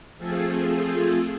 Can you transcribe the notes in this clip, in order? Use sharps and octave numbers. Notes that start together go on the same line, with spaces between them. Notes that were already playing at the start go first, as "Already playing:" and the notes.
F3 A3 C4 F4 G#4 A4